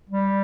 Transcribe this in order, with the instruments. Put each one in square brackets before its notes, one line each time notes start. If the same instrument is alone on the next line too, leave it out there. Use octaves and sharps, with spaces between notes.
[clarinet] G3